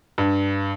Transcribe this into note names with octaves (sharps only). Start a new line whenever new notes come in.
G2